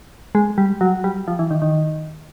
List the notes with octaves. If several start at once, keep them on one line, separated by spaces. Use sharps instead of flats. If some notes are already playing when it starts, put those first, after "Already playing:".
G#3
G3
F#3
G3
F3
E3
D#3
D#3